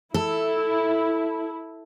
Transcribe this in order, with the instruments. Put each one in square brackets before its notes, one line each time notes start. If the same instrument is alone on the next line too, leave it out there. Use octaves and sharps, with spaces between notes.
[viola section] E4 [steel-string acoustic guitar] A4